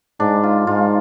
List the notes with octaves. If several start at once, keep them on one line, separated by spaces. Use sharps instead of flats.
G#2 D4
F4
G#2 F4